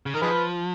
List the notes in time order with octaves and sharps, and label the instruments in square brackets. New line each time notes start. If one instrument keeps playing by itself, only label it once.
[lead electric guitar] C#3
[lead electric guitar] D#3 [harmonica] A#4
[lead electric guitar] F3 [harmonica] D#4 G#4 B4